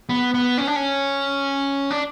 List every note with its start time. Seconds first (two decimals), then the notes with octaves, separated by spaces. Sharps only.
0.09 B3
0.34 B3
0.58 C#4
0.67 D4
0.76 C#4
1.91 D4